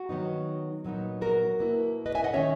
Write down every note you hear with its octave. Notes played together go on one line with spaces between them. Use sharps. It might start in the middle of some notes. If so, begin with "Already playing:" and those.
Already playing: F#4
D#3 F#3 B3 D#4
A#2 F#3 B3 D#4
F#4 A#4
B2 A#3 E4
B4 D#5
E5 G#5
D#5 F#5
D#3 A#3 C#4 C#5 E5